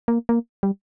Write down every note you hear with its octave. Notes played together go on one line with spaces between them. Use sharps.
A#3
A#3
G3